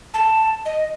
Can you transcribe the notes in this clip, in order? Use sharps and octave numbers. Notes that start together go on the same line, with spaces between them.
A5
D#5